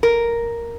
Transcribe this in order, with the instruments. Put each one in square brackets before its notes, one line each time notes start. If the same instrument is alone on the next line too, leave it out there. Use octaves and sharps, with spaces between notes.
[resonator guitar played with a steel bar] A#4